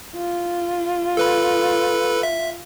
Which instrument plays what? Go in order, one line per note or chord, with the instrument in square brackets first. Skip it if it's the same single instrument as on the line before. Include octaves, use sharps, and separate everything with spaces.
[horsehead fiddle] F4
[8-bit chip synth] A4 B4 B5
E5